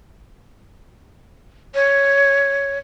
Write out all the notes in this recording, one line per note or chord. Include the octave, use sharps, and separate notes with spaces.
C#5